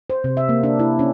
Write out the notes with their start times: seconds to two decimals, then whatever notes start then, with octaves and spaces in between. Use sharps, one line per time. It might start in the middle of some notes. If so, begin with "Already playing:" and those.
0.10 C5
0.24 C3
0.37 E5
0.49 A#3
0.63 D4
0.79 E4
0.99 C#4